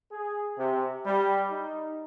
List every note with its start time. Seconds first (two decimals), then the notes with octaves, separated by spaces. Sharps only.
0.12 G#4
0.58 C3
1.06 G3
1.50 D#4